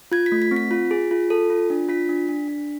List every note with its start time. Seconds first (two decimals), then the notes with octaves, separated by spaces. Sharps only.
0.12 F4 G#6
0.26 B6
0.32 A3
0.42 B6
0.51 C4
0.56 B6
0.71 F4
0.91 G#4
1.11 F4
1.30 A4
1.50 F4
1.70 D4
1.89 F4 B6
2.09 D4
2.29 D4
2.48 D4